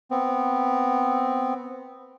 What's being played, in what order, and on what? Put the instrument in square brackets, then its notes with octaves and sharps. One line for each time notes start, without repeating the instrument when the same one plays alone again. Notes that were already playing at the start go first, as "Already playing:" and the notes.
[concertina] B3 C4